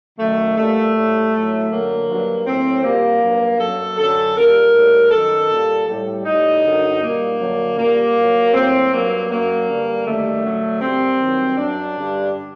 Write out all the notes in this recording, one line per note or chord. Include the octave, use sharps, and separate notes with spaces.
F#2 D#3 F#3 A3
A#2 G3 A3
A2 G3
A2 F#3
F#2 D3 F#3 A#3
G2 F#3
A2 F#3 C4
A#2 G3 A#3
G2 F#3
F#2 F#3 A4
F#2 D3 F#3 A4
A#2 G3 A#4
A2 G3
F#2 D#3 F#3 A4
A#2 G3
A2 G3
A2 G3 D#4
F#2 D3 F#3
A#2 G3 A#3
F#2 D3 F#3
A#2 G3 A#3
A#2 F#3
A2 F#3 C4
G2 F#3 A#3
F#2 F#3 A#3
G2 D3 G3
F#2 D#3 G3 A3
F#2 D3 F#3
A#2 G3 C4
G2 D#3 F#3
F#2 F#3 D4
G2 D3 G3